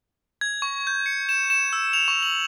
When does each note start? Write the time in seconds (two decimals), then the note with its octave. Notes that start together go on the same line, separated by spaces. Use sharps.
0.41 G#6
0.62 C#6
0.87 G6
1.06 C#7
1.29 E7
1.50 E7
1.73 E6
1.93 F7
2.08 C#6
2.23 F#7